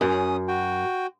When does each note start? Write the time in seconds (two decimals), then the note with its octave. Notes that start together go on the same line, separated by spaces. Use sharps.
0.01 F#2 C#4 D#6
0.48 F#4 G5